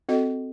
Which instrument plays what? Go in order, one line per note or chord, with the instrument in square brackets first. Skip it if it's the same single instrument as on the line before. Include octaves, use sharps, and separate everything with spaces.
[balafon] C4 F#4 A4 D#5